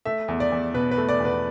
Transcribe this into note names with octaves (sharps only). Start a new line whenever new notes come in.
A3 E5
E2
D5
E2
B2 B4
B4
A3
D5
E2
B4